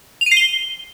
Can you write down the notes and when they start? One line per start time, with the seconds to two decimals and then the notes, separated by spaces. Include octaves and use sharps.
0.21 F7
0.26 D#7
0.32 C7
0.37 G7